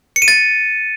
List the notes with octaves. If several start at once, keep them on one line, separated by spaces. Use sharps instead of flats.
C#7
D#7
A6